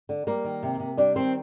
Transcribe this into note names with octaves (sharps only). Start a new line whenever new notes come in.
D3
G3 A#3 A#4
D#3
C3
C3
G3 D4 D5
D#3 C4 C5